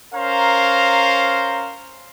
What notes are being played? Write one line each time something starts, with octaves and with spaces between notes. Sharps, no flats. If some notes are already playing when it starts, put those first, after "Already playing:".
C#4 A#4 C5 F5 A#5